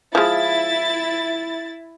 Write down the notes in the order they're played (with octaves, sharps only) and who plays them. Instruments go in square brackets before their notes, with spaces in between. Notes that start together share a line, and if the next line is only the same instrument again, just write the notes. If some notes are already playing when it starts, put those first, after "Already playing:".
[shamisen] F3 G#3 [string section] E4 A6